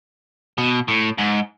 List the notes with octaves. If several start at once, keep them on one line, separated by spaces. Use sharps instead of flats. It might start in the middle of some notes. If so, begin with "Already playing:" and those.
B2
A2
G#2